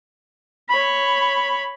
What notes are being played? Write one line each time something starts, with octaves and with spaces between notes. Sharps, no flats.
C#5 B5